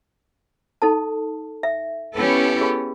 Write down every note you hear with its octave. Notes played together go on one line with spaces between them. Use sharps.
D#4 A4 A5
E5
B3 C#4 E4 G4 A4
G#4 B5